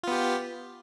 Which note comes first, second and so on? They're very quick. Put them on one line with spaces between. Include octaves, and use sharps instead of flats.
F4 B3 G4